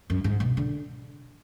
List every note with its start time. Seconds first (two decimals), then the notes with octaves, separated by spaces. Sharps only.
0.10 F#2
0.24 G#2
0.40 B2
0.57 D3